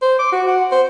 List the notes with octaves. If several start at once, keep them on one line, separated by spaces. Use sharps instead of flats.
C5
D6
F#4
F#5
C5